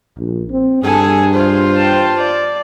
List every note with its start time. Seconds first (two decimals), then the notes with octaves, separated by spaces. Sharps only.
0.18 A#1
0.51 C4
0.83 G2 G#4 A4 G#5
1.33 F4 C5
1.76 G5 A5
2.17 D5